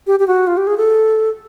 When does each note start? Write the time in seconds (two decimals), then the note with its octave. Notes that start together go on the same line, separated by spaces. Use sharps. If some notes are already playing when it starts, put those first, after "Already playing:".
0.07 G4
0.20 G4
0.27 F#4
0.47 F4
0.57 G4
0.67 G#4
0.77 A4